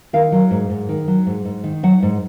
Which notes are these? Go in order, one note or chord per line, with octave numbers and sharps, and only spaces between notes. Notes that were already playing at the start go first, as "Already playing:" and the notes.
D#3 F5
F#3
G#2
G#2
D#3
F#3
G#2
G#2
D#3
F#3 F#5
G#2